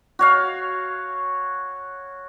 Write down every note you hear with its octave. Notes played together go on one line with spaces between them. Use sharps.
F#4 C#5 F5